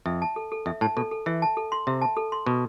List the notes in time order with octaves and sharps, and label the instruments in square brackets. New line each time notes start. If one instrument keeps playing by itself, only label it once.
[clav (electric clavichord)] F2 [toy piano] E5
[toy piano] A5
A4
A4
[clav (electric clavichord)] F2 [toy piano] E5
[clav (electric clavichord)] A2 [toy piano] A5
[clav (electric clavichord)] B2 [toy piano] A4
[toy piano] A4
[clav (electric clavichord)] E3 [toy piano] E5
[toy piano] A5
A4
C6
[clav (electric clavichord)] C3 [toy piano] E5
[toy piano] A5
A4
C6
[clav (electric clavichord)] B2 [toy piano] B4